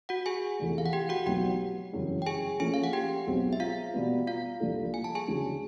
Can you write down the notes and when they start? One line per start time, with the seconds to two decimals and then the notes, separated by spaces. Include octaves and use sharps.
0.09 F#4 F#5
0.26 G#4 G#5
0.59 E2 C3 F3 A3
0.78 F5
0.86 F#5
0.93 G4 G5
1.09 F#4 F#5
1.26 B1 B2 F#3 B3 G4 G5
1.93 G1 F#2 C#3 E3 G#3
2.22 G5
2.26 G#4 G#5
2.60 A#2 F3 A3 C#4 G#4 G#5
2.74 F5
2.84 F#5
2.93 G4 G5
3.27 B1 B2 G#3 C4
3.53 E5
3.60 F4 F5
3.94 B2 G3 B3
4.27 F4 F5
4.60 C2 A#2 F3 A3 D4
4.94 G#5
5.04 A5
5.15 G#4 G#5
5.27 D2 C#3 F#3